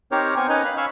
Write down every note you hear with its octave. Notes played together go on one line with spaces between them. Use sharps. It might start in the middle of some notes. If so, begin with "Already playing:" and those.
C4 D#4 G4 A#4 C5 C#5
B3 A#4 C5 G#5 C#6
C#4 D#4 B4 D#5 G#5 A#5
F5 B5
F5 G#5 B5 C#6 E6 F6